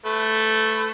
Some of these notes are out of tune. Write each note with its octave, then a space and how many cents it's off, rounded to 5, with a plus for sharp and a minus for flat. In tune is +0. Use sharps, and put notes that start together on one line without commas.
A3 +0 B4 +30